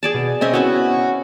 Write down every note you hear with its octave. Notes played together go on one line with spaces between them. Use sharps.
G#4 D5 A5
B2
C4 C#4 D#5 E5
B3 C#4 E4 F#4